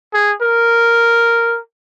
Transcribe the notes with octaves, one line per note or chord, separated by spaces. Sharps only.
G#4
A#4